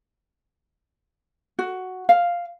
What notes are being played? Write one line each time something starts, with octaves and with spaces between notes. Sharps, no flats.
F#4
F5